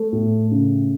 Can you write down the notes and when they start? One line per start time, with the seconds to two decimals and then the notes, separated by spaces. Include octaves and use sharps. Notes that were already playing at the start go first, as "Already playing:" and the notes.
Already playing: A3
0.13 A2
0.51 C#3